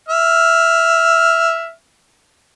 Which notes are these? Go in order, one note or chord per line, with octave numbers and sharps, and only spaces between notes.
E5 F6